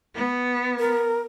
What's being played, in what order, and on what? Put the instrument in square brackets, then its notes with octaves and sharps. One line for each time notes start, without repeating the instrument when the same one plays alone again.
[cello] B3
[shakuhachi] A#4